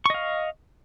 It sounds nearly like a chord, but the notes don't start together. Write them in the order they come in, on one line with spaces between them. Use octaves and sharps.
C#6 D#5 F5